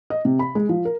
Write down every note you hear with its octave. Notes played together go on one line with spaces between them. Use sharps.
D#5
C3
B5
G#3
F3
A#4